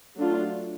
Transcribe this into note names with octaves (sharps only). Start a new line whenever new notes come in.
F#3 A3 D4 F4